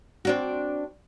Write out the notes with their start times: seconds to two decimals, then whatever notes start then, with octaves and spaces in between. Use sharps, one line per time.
0.25 C4 D4 F#4